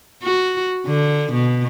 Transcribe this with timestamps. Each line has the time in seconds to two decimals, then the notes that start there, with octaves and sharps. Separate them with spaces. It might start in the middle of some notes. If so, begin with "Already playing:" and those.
0.23 F#4
0.87 D3
1.33 B2